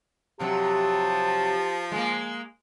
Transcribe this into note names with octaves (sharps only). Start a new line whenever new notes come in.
C3 F3 F#3 G4 A5
G#3 A#3